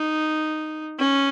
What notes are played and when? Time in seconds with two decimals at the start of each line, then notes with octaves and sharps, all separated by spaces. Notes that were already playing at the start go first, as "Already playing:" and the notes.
Already playing: D#4
0.99 C#4